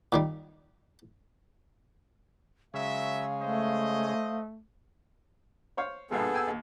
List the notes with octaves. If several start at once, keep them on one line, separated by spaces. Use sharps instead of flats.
A#2 D#3 G3
C#3 F#3 G#3 E5 F5
A3 C5 D#5
C5 C#5 F5
A#1 G2 B2 B3 G#4 A4
G5 G#5 E6
D#2